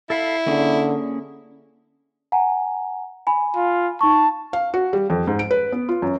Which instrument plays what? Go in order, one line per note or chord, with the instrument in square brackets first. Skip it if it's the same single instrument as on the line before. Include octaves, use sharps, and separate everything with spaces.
[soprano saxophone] E4 [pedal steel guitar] A4 F5 B5
[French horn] D3 [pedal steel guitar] A#3 C#4 G#4
[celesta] F#5 G#5 A#5
G#5 B5
[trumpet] F4
[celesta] D#4 C#6 [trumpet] A5
[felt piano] F5
F#4
G3
F2
G#2
D7
B4
B3
F4
F#2